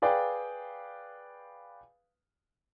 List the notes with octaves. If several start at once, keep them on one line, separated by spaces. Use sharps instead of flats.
G#4 B4 D5 F5 G5